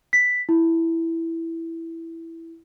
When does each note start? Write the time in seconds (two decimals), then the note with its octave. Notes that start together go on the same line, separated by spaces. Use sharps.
0.13 B6
0.49 E4